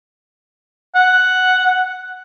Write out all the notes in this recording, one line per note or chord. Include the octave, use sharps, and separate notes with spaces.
F#5